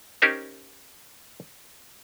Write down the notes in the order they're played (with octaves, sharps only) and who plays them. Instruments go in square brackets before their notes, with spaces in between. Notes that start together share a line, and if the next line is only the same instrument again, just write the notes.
[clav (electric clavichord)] C#4 D#4 G4 A#4 C5